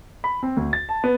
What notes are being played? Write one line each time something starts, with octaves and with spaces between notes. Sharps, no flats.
B5
C4
D2
A6
A5
B3